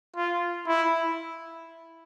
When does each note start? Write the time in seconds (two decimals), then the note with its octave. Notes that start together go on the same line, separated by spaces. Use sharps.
0.16 F4
0.67 E4